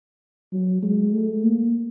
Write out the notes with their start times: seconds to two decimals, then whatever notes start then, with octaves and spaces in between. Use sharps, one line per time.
0.53 F#3
0.83 G#3
1.13 A3
1.43 A#3